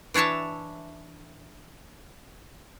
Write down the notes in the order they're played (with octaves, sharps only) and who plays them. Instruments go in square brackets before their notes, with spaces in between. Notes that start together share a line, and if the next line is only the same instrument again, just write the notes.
[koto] E3 D4 C#5 E5 A5